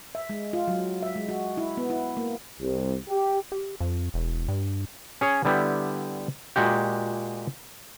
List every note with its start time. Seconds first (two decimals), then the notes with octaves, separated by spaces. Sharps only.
0.15 E5
0.29 G#3
0.53 F4
0.68 F#3
1.02 E5
1.16 G#3
1.29 F#4
1.57 E4
1.77 B3
1.90 E4
2.17 A#3
2.61 C2
3.09 G4
3.52 G4
3.80 F2
4.14 E1
4.48 G2
5.21 C#4 G#4 C#5
5.45 D3 G3 B3 E4 G4
6.56 A#2 G#3 F#4 G4